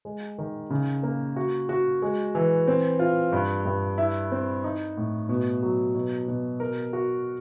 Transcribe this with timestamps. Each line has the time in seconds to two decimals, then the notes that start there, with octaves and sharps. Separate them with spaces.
0.05 G#3
0.38 D#3
0.70 C#3
1.03 A#3
1.36 F#4
1.69 F#4
2.02 G#3
2.35 E3
2.68 C4
3.00 F4
3.33 G2
3.65 G2
3.98 E4
4.32 C4
4.64 D#4
4.97 A2
5.29 B2
5.63 F#3
5.95 B2
6.28 B2
6.60 A#4
6.93 F#4